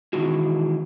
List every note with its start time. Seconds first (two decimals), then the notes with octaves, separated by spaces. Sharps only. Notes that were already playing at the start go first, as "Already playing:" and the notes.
0.13 B2 D#3 E3 G#3 F#4